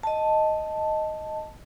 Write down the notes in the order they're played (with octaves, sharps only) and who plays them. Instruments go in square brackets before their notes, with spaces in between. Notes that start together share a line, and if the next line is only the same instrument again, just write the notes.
[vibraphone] D#5 A5